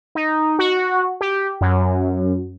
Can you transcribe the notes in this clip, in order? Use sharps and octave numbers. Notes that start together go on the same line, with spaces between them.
D#4
F#4
G4
F#2